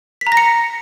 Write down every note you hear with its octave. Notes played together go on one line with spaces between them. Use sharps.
B6
A#5
A#6
C#7